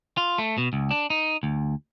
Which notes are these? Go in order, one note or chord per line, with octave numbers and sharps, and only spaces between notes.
F4
A3
B2
C#2
D4
D#4
D2